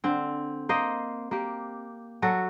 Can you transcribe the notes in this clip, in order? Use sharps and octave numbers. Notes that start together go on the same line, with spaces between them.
D3 C4
A#3 C5 D#5
A#3 G4
F#3 F#4 A4